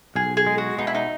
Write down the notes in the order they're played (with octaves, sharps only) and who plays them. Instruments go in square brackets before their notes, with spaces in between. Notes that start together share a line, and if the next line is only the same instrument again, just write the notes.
[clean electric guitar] B1 [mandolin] G#4
[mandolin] G#4
[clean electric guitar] G#3
[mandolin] F#4
[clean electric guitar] B2 [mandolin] D#4
[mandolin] E4
D#4